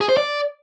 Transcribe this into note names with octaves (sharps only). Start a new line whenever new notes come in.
G#4
C5
D5